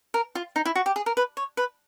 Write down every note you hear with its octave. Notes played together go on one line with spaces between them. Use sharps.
A#4
F4
D#4
E4
F#4
G4
G#4
A#4
B4
C#5
B4